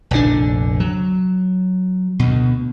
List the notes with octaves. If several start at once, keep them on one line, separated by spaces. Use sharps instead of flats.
F1 A#1 D3 D4
F#3
D2 B2